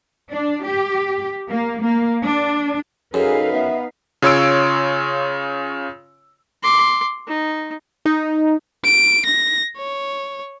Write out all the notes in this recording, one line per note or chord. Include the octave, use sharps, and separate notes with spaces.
D4
G4
A#3
A#3
D4
F#2 D#4 G#4 A4 B4 F5
B3 E5
C#3 F4 C#5 C6 E6 D7
C6 D6
D#4
D#4
D7
A#6
C#5